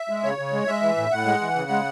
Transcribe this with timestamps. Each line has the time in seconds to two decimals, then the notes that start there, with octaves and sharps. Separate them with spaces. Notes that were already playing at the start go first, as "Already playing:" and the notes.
Already playing: E5
0.09 G#3
0.24 C#3 C#5
0.38 C#3
0.53 G#3
0.67 G#3 E5
0.82 E3
0.97 A2
1.11 A2 F#5
1.26 G#3
1.41 E3
1.56 C#3
1.70 G#3